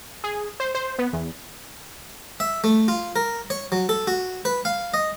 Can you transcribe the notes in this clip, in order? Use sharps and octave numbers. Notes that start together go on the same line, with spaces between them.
G#4
C5
C5
B3
E2
E5
A3
F4
A#4
C#5
F#3
A4
F#4
B4
F5
D#5